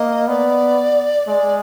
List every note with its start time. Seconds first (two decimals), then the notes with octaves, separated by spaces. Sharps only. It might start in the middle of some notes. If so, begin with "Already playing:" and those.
Already playing: A#3 D#5
0.28 B3 D5
1.27 G#3 D5